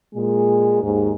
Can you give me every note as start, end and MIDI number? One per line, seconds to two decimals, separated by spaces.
0.15 0.78 46
0.15 0.78 56
0.82 1.14 39
0.82 1.14 44